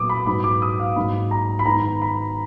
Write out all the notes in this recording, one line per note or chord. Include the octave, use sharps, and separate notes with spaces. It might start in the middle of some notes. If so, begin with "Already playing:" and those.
Already playing: A#2 F#3 B3 D6 D#6
B5
G#2 F#3 B3 B5
D6
D#6
F5
G#2 F#3 A#3 B5
A#5
B5
G#2 D#3 G#3 B3 A#5
B5